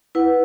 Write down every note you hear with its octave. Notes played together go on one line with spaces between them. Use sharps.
E4 B4 F#5